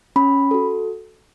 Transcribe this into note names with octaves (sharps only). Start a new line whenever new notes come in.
C#4 B5
F#4 A4